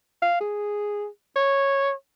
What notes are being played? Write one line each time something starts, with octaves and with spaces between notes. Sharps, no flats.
F5
G#4
C#5